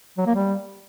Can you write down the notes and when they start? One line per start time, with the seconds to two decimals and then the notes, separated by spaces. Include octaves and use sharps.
0.18 F#3
0.27 A#3
0.35 G3